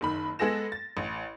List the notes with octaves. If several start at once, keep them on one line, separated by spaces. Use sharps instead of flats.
F#1 D#3 B5
G#3 B3 G#4 A4 A#6 E7
A6
A1